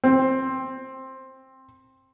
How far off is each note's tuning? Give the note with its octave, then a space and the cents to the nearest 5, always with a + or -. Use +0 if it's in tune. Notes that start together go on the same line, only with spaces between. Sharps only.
C4 +10